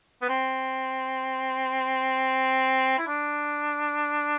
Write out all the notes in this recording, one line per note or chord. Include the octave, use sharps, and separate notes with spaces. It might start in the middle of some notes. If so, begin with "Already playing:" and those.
B3
C4
E4
D4